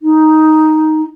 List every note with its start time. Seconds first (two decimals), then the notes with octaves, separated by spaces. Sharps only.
0.02 D#4